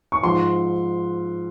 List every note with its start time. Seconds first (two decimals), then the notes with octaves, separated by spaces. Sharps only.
0.12 C#6
0.23 G#2 F3 C6